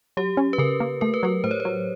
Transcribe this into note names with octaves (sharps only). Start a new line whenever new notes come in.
F#3 G4
C#4
B4
C#3 A#4
A#3
A3 A#4
B4
F#3 A#4
A2 C5
C#5
C5
F#3